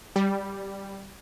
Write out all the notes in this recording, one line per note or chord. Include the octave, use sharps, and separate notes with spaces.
G3